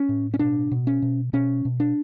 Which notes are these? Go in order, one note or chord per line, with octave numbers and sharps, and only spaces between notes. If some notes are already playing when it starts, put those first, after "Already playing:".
Already playing: C#4
A2
C#4
B2 D4
B2
C#4
B2
B2 C#4
B2
D4